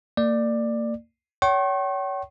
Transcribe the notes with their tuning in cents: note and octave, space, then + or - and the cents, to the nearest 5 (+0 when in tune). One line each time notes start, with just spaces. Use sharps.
A#3 -35 D5 +15
C#5 +25 G5 -45 C#6 -40